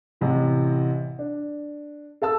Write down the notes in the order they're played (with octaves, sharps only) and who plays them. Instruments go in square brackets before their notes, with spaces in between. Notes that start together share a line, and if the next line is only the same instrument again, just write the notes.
[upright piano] A1 C3 E3
D4
A4 F5 A5 E6